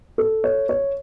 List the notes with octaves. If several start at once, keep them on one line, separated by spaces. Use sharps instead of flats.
A4
C#5
C#5